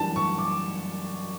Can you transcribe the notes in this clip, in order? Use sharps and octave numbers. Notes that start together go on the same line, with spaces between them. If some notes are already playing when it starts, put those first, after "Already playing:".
Already playing: F#2 E3 G3 D4 A5
C#6
D6